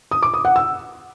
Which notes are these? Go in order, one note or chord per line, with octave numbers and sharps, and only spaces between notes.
D#6
D6
D#6
F#5
E6